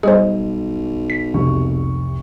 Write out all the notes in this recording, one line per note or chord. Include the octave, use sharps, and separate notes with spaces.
B1 G3 G#4 C5 D#5
B6
F1 C2 C#6